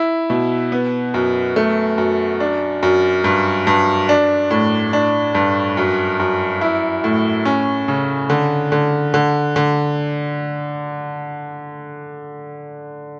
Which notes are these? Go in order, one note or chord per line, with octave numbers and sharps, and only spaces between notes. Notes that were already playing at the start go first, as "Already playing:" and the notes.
Already playing: E4
B2
B3
F#2
A3
F#2
D4
F#2
G2
G2
D4
A2
D4
G2
F#2
F#2
E4
A2
C#4
C#3
D3
D3
D3
D3